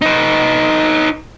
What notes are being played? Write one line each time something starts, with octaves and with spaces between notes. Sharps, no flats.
D#4 B4